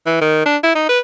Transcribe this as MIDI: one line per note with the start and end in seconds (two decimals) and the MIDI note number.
0.06 0.18 52
0.21 0.41 51
0.46 0.57 62
0.64 0.73 64
0.75 0.87 63
0.89 0.99 71